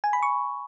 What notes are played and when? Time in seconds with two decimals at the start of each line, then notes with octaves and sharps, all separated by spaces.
0.04 G#5
0.13 B5
0.23 C#6